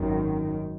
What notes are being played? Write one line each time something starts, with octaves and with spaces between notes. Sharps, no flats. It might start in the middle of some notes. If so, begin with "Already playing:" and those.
Already playing: G#1 F#2 D#3